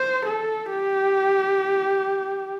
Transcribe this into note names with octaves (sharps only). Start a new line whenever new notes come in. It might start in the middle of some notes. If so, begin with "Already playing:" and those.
Already playing: C5
A4
G4